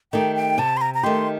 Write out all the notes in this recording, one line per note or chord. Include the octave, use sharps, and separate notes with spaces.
D#3 A3 D#4 G4 G5
G5
C3 A5
C6
A#5
A#5
D#3 A3 D#4 G4 C6